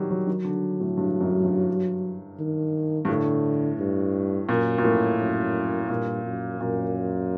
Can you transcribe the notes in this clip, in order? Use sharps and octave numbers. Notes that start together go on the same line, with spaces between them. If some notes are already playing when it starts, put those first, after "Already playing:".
Already playing: D#3 F#3 G3
F#3
D#3 F#3
D3
A2
G2
F#2
G2
D#3
G2
A2 D3
G2
F#2 A#2
A#2
A2
F#2
G2 A#2
F#2
F#2 A#2